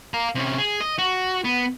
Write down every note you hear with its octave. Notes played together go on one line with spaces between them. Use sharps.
F5 A#5
C3 C#4
G#4
D#5
F#4
B3